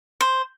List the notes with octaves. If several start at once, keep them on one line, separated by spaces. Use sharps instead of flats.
C5